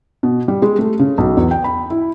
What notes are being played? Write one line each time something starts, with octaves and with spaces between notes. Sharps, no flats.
B2
G3
G#3
A3
C#3
B1
E2
G5
B5
E4